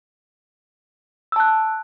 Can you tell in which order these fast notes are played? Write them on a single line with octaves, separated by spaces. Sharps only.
E6 A5 F#6